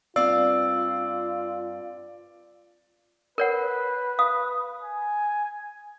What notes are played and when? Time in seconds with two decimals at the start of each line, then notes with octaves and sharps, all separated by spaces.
0.16 G2 C4 F4 D5 F5 E6
3.38 A#4 B4 C#5 F#5
4.19 F5 D#6
4.81 G#5